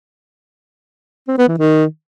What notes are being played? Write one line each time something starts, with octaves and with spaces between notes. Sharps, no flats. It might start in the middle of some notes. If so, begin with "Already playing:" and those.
C4
B3
E3
D#3